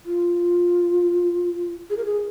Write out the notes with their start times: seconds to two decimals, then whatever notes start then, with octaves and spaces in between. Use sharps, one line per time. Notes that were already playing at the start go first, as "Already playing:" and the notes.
0.06 F4
1.90 G#4
1.97 A#4
2.05 G#4